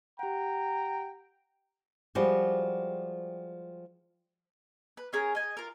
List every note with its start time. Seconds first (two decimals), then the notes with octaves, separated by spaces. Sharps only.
0.19 G4 F#5 G5 A#5
2.15 F3 G3 G#3 F#4 G4
4.97 B4
5.13 C#4 G#4 A#4
5.35 D#5 G#5
5.57 F4 A#4